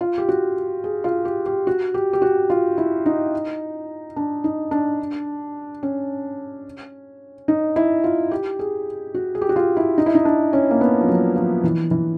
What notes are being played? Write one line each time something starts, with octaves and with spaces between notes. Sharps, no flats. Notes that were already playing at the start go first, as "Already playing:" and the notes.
F4
G4
F#4
G#4
F4
G4
G4
F#4
G4
G4
F#4
F4
E4
D#4
D4
D#4
D4
C#4
D#4
E4
F4
G4
G#4
F#4
G#4
G4
F#4
F4
E4
D#4
E4
D#4
D4
C#4
A#3
B3
F3
F#3
F3
E3
E3